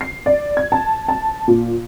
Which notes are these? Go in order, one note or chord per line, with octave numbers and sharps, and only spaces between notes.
C7
D5
G#6
A5
A5
A#2